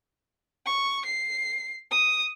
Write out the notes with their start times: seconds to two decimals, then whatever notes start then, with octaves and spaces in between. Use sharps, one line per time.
0.66 C#6
1.06 C7
1.91 D#6